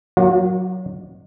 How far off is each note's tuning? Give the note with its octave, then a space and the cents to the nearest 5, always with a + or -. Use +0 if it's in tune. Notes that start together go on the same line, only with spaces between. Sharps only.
F#3 +0 A#3 +15 F#4 -45